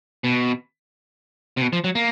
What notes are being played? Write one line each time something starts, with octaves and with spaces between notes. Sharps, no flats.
B2
C3
B2
F3
F#3
A#3